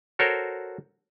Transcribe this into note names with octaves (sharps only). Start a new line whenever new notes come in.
F#4 A4 A#4 C5 C#5